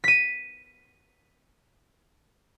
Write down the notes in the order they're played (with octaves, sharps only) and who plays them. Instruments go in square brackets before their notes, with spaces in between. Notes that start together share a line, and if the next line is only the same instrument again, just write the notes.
[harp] B6 D#7